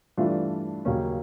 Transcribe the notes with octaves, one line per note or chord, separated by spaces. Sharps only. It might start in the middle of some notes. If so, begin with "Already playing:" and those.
G2 E3 A3 D4 F4
D#2 C#3 F#3 A#3 C#4